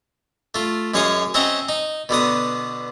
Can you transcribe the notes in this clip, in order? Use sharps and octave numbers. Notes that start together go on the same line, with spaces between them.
A3 F4
F#2 G#3 C#5 F5 C#6 D#6
C4 C#4 D#5 E5 F#5 A#5
D#4
B2 D3 B3 D#6